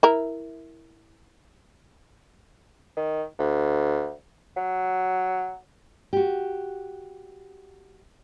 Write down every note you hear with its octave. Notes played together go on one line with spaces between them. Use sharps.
E4 A#4
D#3
D2
F#3
F#4 G4